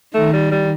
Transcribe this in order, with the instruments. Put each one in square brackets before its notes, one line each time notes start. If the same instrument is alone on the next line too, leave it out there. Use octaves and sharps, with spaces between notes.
[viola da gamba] D#3 [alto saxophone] A3
[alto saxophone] G3
G3